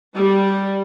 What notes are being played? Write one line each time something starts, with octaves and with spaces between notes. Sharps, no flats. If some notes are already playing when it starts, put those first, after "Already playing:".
G3